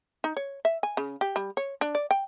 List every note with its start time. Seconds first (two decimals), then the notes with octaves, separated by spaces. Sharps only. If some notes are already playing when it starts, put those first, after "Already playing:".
0.24 D#4
0.37 C#5
0.65 E5
0.83 G#5
0.97 C#3
1.21 G4
1.36 G3
1.57 C#5
1.81 D4
1.95 D5
2.11 G5